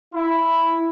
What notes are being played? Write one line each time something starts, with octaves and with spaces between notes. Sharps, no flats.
E4